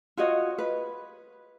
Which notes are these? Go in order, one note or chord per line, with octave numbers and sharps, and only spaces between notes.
F4 F#4 C#5 D#5
B4